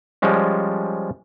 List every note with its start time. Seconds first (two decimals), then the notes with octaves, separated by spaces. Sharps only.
0.22 F3 G3 G#3 C#4